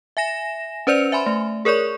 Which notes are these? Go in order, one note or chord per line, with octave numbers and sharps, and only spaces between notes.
E5 G#5 A#6 E7
C#4 B4 C5 D5 C#7 F7
E5 G#5 B5 C6
A3
G#4 A#4 C#5 D5 C#6